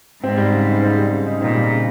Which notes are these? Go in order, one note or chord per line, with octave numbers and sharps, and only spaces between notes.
G#2 C4
G3
C#3
D#4
C4
G3
C#3
D#4
A#2 C4
G3
C#3